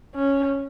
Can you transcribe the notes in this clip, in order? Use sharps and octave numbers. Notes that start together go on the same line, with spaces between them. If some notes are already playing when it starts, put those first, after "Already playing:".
C#4